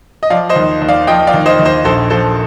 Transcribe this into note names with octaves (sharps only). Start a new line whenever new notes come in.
D#5
F3 D5 F5
C5 D#5
D#2
D#2
D5 F5
F3 D#5 G5
D5 F5
D#2
C5 D#5
D#2
C5 D#5
A#1 A4 C5
F3 A4 C5